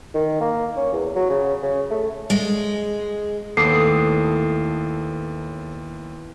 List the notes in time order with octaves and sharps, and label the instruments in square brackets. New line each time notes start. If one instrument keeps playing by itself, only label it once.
[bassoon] D#3
A#3
C#4
E2
F#3
C#3
C#3
A3
[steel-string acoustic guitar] G#3
[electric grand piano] D#2 [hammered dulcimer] A2 B3 [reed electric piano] A4 D6 D#6 [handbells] C7